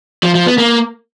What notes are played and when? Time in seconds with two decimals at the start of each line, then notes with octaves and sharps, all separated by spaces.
0.23 F3
0.35 F3
0.46 B3
0.58 A#3